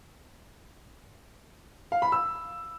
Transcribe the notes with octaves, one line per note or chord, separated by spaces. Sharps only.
F5
B5
E6